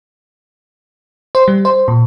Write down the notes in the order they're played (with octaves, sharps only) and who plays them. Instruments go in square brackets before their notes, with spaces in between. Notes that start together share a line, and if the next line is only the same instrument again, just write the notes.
[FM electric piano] C5
G3
C5
A#2